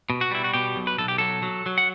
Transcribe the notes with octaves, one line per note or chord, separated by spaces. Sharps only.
B2
F#4
G3 E4
F#4
B2 G4
B1
B4
B1 A4
G4
F#3 A4
F#3
F#3
F#5